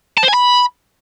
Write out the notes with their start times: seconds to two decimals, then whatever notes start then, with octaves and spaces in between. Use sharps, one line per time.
0.17 A5
0.23 C5
0.28 G#5
0.33 B5